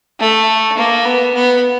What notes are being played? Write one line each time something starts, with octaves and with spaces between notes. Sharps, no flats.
A3
A#3
B3
B3